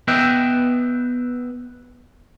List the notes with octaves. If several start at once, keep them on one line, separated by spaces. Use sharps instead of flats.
B3 B4 D#5 E5 G5